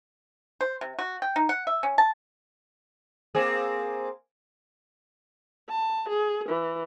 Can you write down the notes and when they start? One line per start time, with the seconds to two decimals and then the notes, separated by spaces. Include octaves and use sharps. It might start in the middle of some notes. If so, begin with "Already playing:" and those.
0.61 C5
0.81 C3
0.99 F#4
1.22 G5
1.36 D#4
1.49 F#5
1.67 E5
1.83 C#4
1.98 A5
3.35 A#3 C4 G#4
5.69 A5
6.08 G#4
6.48 E3